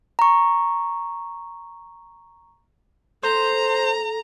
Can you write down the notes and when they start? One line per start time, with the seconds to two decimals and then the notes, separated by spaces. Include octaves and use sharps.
0.19 A#5 C#6
3.23 A4 C5 A#5